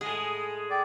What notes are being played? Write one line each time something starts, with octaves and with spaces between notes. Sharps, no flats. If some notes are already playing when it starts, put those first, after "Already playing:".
A2 G#3 G#4
D5 G5